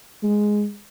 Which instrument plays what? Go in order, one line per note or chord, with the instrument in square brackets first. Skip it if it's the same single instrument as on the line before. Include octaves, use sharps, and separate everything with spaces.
[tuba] G#3